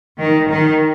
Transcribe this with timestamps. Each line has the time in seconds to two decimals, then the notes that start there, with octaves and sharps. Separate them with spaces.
0.18 D#3
0.48 D#3